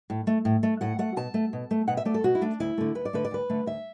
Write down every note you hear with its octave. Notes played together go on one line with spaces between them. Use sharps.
A2
A3
A2
A3
A2 F#5
A3 F#5
B2 A5
A3
B2
A3
B2 F#5
E5
A3 D5
A4
B2 F#4
E4
A3 D4
D2 E4
D3 A3
D2 B4
D5
D3 A3 B4
D5
D2 B4
D3 A3
D2 E5